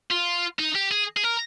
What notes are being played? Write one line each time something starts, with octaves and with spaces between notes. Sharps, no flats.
F4
D#4
G4
G#4
G#4
A#4